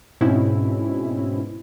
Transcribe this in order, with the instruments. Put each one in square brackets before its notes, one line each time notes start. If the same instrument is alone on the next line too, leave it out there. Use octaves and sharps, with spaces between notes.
[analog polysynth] G#2 B2 C4 C#4 E4